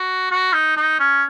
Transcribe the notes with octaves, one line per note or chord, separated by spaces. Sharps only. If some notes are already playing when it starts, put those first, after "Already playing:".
Already playing: F#4
F#4
D#4
D#4
C#4